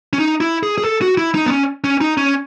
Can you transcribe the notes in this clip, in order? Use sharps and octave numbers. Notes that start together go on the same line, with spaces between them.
C#4
D#4
E4
G#4
G#4
A4
F#4
E4
D#4
B3
C#4
C#4
D#4
C#4